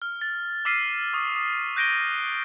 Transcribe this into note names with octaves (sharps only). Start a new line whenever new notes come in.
F6
A6
D6 E6 F6 B6 C7 D#7
C#6 D#6
D#6
F#6 G6 A#6 D7 D#7 G7